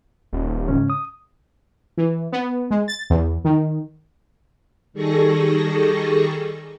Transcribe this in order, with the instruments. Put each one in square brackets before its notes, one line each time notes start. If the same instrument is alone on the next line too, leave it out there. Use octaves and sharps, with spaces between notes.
[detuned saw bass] D#1
[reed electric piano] G#2 C#3 C#4
D#6
[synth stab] E3
B3
G#3
A6
E2
D#3
[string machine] D#3 G3 G#4 A4 C#6 A#6